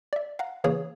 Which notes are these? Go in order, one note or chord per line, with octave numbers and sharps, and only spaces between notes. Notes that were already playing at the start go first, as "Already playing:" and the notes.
D5 E5
F5 F#5 A#5
C#3 E3 A#3 G#4 C#5